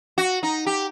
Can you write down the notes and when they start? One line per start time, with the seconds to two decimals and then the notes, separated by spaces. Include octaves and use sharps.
0.18 F#4
0.43 D#4
0.66 G4